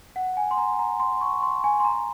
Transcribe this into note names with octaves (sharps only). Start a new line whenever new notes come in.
F#5
G#5
C6
A#5
A#5
C6
C#6
C6
G#5
C6
A#5